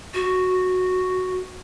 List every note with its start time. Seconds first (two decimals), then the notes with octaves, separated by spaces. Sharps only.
0.14 F#4